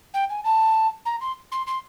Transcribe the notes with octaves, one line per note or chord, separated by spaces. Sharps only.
G5
G#5
A5
A#5
C6
C6
C6